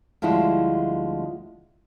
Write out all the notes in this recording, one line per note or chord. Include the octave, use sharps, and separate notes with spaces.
D2 F3 G3 G#3 E4